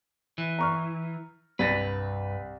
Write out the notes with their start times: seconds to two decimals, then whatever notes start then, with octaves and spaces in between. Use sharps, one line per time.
0.38 E3
0.59 A#5 C#6 F6
1.59 C2 G2 B4 A6 A#6